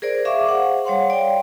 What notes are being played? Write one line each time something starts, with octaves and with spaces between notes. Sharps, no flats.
G#4 A#4 C5 D5
G#4 E5 F5 C#6 D6
C5 F#5
G3 C#5 F5 F#5 C6
D5 G5